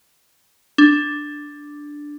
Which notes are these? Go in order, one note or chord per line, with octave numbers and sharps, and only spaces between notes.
D4